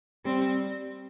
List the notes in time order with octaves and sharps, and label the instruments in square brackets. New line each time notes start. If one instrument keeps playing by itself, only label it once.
[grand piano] G3 [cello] C4